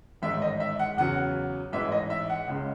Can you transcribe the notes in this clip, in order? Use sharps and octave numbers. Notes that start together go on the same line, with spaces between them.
A1 G#2 D#3 G#3 E5
D#5
E5
F#5
E2 C#3 F#3 F#5
A1 G#2 E3 G#3 E5
D#5
E5
F#5
C#2 C#3 G#3